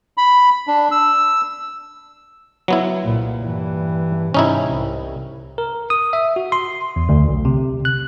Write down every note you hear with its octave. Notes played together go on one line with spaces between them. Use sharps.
B5
D4
E6
F#3 B3 E4
C2 A#2
G2 E3
G#2 C3 C#4 D#4 E4
C2
A#4
D#6
E5
F#4
C6
E2
D2
B1
C3
F#6